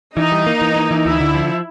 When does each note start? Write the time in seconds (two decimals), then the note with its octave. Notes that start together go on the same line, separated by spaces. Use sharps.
0.17 E3 D#4
0.32 G3
0.46 A#3
0.61 E3
0.76 A#3
0.91 E3
1.05 D2 E4
1.20 D3
1.34 F3